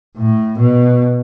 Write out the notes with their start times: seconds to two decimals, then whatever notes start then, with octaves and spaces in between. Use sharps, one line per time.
0.17 A2
0.58 B2